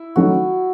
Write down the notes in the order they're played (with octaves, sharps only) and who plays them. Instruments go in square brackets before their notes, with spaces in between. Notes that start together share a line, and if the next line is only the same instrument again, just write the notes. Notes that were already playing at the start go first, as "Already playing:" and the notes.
Already playing: [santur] E4
[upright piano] D#3 F#3 A3 C#4 [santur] F#4